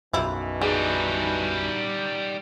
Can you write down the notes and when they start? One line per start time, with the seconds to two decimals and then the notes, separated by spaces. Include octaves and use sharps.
0.13 B1 F#2 B2 D#3 E3 G3 E4 F4
0.61 G3 D#4 G#4